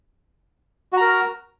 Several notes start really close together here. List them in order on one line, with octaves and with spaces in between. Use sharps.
F#4 A#5 A#4